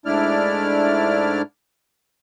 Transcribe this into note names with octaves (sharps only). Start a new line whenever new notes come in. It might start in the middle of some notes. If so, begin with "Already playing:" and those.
G#2 A3 D4 E4 D5 F6